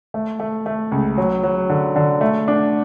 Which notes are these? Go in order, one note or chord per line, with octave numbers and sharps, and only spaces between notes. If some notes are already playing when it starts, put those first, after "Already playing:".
A3
A3
A3
C#2
F#3
F#3
D3
D3
A3
D4